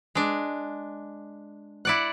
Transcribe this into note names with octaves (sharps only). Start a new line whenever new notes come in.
G#3 D4
E4 D5 F#5